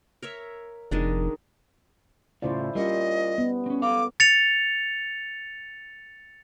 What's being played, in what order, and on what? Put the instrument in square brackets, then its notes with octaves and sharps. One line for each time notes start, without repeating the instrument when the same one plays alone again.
[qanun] A#4 C#5 E5
[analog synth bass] F1 [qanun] D#3 G#3 D4
[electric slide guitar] A2 C#3 F4 [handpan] E4 C5 D5
[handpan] G3 C#4 [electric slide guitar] F4 A#4 C5 [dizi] D#5
[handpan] B3
[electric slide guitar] C4 C#4
[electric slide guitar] A4 F5 [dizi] D6
[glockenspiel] A6 C#7 F7